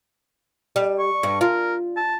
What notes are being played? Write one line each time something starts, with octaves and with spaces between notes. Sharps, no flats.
G3
C#6
G2
F4 A#4
A5